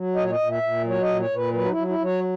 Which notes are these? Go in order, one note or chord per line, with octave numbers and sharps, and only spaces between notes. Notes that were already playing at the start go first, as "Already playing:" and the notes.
Already playing: F#3
A#2 D#5
C#5
D#5
A#2
E5
A#2
F#3
C#5
D#5
A#2
C#5
A#2
B4
F#3 B4
D#4
E4
F#3
E4
F#3
C#5